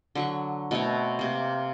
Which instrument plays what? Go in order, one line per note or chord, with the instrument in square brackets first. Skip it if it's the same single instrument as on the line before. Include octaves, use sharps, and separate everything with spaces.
[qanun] D3 F#3 C#6
B2 A3 C4 C#5
C3 A#3